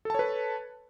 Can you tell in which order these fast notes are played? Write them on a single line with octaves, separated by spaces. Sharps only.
A4 A5 C#5 B4